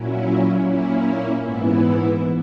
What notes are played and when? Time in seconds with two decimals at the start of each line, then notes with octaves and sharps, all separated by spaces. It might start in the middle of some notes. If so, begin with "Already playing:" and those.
Already playing: A#2 F#3 C#4 E4
0.65 A#2 A#3 C#4 E4
1.43 G#2 E3 B3 E4